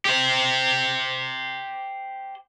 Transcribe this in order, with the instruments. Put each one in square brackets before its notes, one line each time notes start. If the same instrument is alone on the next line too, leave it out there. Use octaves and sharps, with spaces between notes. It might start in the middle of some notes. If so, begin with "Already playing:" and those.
[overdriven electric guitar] G4 C5